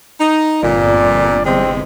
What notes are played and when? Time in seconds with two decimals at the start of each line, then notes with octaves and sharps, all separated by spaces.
0.19 D#4
0.63 G1 F2 A#2 D5
1.46 E2 C3 G#3 C4